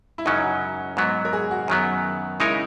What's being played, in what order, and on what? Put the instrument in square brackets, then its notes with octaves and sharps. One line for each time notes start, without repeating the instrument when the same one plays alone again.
[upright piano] E4
[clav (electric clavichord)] F#2 C#3 F#3 C#4 [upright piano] D#4
[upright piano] F#4
[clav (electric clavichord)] G#2 F#3 B3
[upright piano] A#4
G#4
F#4
[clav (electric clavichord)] F#2 D#3 F#3 B3
[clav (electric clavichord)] C#3 G#3 D#4 A#4 C#5 [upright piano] E4